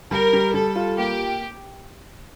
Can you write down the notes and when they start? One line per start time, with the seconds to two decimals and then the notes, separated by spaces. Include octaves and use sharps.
0.11 G3 A#4
0.33 G3
0.54 G3 A4
0.76 F4
0.98 A#3 G4